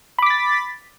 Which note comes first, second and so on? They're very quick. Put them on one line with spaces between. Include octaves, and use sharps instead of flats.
B5 D6 B6 A6